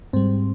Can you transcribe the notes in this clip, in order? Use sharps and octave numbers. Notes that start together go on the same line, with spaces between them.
G#2 G3 C4